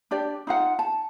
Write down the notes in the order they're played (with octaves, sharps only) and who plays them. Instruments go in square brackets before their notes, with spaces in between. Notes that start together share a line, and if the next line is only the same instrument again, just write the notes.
[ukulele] D4 G4 D5
D#4 F4 F#5
A5